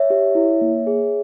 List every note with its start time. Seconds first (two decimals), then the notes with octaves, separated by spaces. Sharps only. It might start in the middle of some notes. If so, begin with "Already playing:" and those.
Already playing: C#5 E5
0.10 G4
0.35 E4
0.61 A#3
0.87 G#4